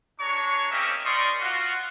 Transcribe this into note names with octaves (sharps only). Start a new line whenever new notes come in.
D4 G#4 C#5 A#5 C#6
A#3 C4 C#4 G4 D#5 E5
D#4 A#4 D5 C6 C#6 D#6
F4 F#4